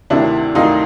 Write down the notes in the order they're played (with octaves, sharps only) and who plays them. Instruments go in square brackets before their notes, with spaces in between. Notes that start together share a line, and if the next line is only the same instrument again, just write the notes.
[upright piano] D2 C3 D#3 D4 E4
D2 C3 D#3 D#4 F4